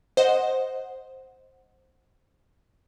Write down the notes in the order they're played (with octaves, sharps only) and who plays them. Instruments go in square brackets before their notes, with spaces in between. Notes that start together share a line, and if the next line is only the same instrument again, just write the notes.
[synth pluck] C5 D#5 F#5